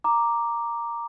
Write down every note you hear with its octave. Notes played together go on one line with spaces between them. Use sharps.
A#5 D6